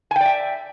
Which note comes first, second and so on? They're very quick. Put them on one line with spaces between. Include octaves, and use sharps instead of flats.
G#5 G5 D5 E5